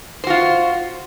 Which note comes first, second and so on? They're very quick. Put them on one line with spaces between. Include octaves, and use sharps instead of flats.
C5 F#4 F4